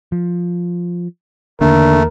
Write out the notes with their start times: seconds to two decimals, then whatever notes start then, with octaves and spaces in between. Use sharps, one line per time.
0.12 F3
1.61 E2 D3 D#3 A3 A#3 A#4